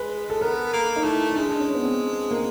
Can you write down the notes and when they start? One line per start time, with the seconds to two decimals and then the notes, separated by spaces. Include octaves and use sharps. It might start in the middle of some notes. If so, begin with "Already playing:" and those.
Already playing: G#3 B4
0.30 A4
0.41 B3 A#4
0.73 A#3 A4
0.96 D#4
1.04 A3 E4
1.30 D#4
1.36 G#3 D4
1.49 D4
1.59 C#4
1.74 B3
1.84 C4
2.31 A#3